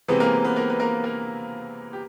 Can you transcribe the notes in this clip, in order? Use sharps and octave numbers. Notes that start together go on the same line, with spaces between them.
C3 E3 G#3 B3 C4 B4
A#3 A#4
B3 B4
A#3 A#4
B4
A#3 A#4
A#3 A#4
G4